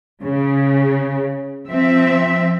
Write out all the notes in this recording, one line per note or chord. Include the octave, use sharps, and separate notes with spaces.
C#3
F3 C4 E5